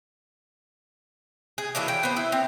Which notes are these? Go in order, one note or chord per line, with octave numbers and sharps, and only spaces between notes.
G#4
E3 F#3 A#3 D4
G5
B3 C5
E4
C4